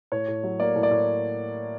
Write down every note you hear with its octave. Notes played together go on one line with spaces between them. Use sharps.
A2 C#5
A2
F#3
A#3 D5
A2
D5
A2